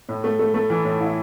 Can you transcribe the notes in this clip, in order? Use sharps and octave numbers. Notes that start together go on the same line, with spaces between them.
A2
A3
A3
A3
E3
A2
E4